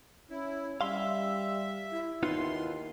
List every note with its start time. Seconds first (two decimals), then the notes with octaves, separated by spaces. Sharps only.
0.30 C#4 E4
0.81 G3 E5 F5 C6
1.91 E4
2.23 D#2 B3 D#4 F4 C6